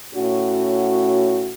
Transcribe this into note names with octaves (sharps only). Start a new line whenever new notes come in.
A2 C#4 F#4